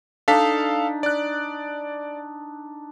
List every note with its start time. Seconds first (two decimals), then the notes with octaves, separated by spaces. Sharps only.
0.28 D4 D#4 A4 F5 B6
1.03 D5 F#6